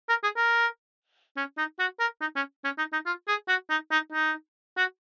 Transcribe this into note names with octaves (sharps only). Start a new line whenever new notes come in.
A#4
G#4
A#4
C#4
D#4
F#4
A#4
D#4
C#4
C#4
D#4
D#4
F4
G#4
F#4
D#4
D#4
D#4
F#4